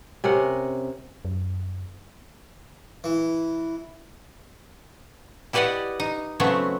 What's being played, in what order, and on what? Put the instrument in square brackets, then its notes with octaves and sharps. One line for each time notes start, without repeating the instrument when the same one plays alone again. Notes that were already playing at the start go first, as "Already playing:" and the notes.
[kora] C3 C#4 A#4 F#5
[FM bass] F#2
[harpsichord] E3
[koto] E4 G4 B4 D5 D#5 F#5
D#4
C#3 F#3 A3 B3 C4